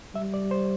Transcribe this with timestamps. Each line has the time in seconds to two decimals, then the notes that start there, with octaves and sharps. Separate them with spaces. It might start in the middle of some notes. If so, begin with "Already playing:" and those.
0.15 G3 E5
0.34 D5
0.51 C5